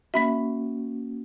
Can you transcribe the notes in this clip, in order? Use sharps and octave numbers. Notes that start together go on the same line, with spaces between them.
A#3 C#4 F#4 E5 B5 B6